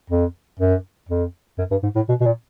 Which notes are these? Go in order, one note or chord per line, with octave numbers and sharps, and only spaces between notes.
F2
F#2
F2
F#2
G2
G#2
A2
B2
B2
A#2